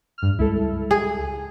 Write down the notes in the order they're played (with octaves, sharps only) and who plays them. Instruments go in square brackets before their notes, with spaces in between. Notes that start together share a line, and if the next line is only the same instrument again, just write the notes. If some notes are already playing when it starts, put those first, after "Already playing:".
[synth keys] G2 F6
[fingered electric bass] C#2 G3 G#3 [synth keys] E4 A4
[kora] G#4